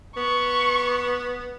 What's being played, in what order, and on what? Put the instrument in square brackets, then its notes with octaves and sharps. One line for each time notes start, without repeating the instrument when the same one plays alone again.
[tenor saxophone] B3 [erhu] C#6